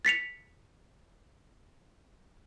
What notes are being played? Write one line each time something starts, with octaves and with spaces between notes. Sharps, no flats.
A6 B6 C#7 F7